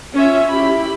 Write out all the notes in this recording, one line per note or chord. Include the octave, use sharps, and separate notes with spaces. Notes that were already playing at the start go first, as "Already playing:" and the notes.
C#4 F4 E5
E4 G4 B5